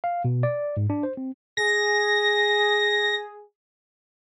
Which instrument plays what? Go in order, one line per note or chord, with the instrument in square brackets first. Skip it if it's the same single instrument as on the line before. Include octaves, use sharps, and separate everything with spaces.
[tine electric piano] F5
B2
D5
G#2
D4
C5
C4
[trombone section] G#4 [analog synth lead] A#6